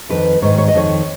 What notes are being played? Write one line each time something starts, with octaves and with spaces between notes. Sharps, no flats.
F2 D#3 B4
G#2 D#3 C#5
C#5
D#5
F2 D#3 C#5